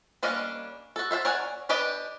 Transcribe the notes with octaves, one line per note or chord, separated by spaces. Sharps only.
G3 A#3 C#4 D4 D#5
F#4 A4
C5 E5 F5 A5
A#4 C#5 D5 F#5 G#5
D4 G4 B4 D#5 G5